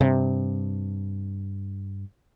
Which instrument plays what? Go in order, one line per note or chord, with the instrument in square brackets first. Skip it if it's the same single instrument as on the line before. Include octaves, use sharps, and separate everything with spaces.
[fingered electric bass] G2 [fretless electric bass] C3